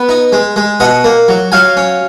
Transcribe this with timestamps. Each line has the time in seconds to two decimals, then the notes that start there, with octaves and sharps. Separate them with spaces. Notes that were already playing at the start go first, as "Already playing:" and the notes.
Already playing: B3
0.09 D#4
0.32 G#3
0.56 G#3
0.80 B2 D#5 F#5
1.04 A#3
1.28 F#3
1.52 F#3 F5 G#5
1.77 C#4